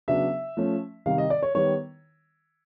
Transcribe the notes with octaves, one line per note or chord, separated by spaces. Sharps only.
C#3 F#3 B3 D4 E5
F3 A3 C#4
C3 D#3 G3 F5
D#5
D5
C#5
D#3 G3 B3 C#5